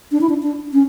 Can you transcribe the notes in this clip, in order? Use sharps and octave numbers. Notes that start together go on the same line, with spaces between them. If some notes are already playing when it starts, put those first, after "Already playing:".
D4
E4
D4
D4
C#4